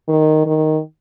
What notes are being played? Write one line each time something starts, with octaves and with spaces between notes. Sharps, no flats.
D#3
D#3